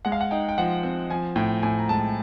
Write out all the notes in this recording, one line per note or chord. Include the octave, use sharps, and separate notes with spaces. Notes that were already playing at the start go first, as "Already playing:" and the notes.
G#3 F#5
F5
F#5
D#4 G5
G5
F3 F#5
C4
F3 G#5
A2 G5
A2 G#5
A#5
G#3 A5